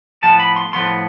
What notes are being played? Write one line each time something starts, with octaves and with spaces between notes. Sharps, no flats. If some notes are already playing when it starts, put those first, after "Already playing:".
A2 F3 B3 A5
B5
C6
A2 F3 B3 C6